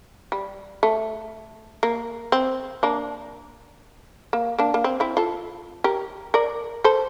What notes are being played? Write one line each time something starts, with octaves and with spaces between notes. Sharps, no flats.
G3
A3
A#3
C4
A#3 D4
A#3
A#3 D4
A#3
C4
C4 E4
F4 A4
G4 A#4
A#4 D5
A4 C5